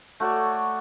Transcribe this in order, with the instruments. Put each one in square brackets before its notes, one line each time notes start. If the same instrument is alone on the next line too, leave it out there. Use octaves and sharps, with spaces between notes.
[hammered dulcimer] A3 F#4 C#5 D5